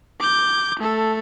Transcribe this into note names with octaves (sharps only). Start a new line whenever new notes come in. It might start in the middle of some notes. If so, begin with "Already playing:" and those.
D6 G6
A3 A4